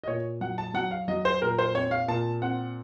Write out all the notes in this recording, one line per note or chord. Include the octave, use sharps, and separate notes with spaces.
D#5
A#2 C#5
F#3 F#5
A5
F#3 F#5
F5
F#3 D#5
C5
A#2 A#4
C5
C4 C#5
F5
A#2 A5
C4 F#5